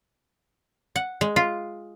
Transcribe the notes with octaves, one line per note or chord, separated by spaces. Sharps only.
F#5
G#3
F4